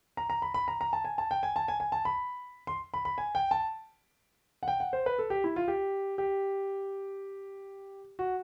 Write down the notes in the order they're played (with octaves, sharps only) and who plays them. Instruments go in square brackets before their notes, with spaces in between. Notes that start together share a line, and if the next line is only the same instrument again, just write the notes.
[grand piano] A#5
A#5
B5
B5
A#5
A#5
A5
G#5
A5
G5
G#5
A5
G#5
G#5
A5
B5
C6
B5
B5
G#5
G5
A5
F#5
G5
F#5
C5
B4
A4
G4
E4
F4
G4
G4
F#4